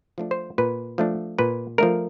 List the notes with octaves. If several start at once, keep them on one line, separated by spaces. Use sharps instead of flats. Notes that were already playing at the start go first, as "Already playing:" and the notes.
F3 A3 D4
C5
A#2 B4
F3 A3 D4
A#2 B4
F3 A3 D4 A#4